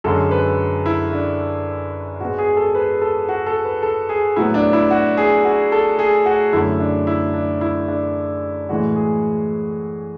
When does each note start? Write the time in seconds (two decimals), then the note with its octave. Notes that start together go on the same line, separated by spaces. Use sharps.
0.04 F#2 D3 G#3 A4
0.31 B4
0.86 E4
1.13 D4
2.20 G#2 G#3 B3 F#4
2.38 G#4
2.57 A4
2.75 B4
3.01 A4
3.29 F#4
3.46 A4
3.64 B4
3.83 A4
4.09 G#4
4.36 A2 F#3 B3 E4
4.54 D4
4.73 E4
4.90 F#4
5.17 G#4
5.45 F#4
5.72 A4
5.99 G#4
6.26 F#4
6.53 F#2 D3 A3 E4
6.80 D4
7.07 E4
7.34 D4
7.61 E4
7.88 D4
8.69 A2 E3 G#3 F#4
8.96 G#4